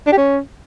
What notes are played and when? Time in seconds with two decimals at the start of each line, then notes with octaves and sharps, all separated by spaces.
0.07 D4
0.12 G4
0.18 C#4